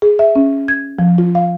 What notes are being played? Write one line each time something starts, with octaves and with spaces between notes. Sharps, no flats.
G#4
E5
C#4
G#6
F3
F4
F5